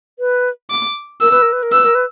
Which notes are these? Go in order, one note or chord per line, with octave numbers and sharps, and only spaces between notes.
B4
D6
A#4 E6
B4
A#4
B4
A#4
B4 E6
A#4
B4